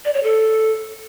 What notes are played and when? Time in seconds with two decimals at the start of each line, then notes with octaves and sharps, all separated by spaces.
0.05 D5
0.14 C#5
0.23 A4